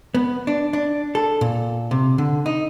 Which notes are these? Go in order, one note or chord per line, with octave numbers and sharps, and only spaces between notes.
B3
D4
D4
A4
A#2
C3
D3
D#4